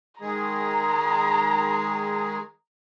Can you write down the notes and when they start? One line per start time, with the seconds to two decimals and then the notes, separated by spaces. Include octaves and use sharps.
0.21 D#3 G#3 G#4 A#5